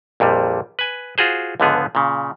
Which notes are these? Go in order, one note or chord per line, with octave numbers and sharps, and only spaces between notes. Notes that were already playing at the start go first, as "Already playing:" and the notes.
A#1 F2 A#2 G3
B4 G#5
F4 F#4 G#4 C5
C#2 G#2 D3 F3 B3 G#4
A#2 C#3